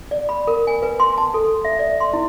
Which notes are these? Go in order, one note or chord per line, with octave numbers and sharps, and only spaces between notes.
D5
B5
A#4
G#5
B4
C6
A5
A4
E5
D5
C6
E4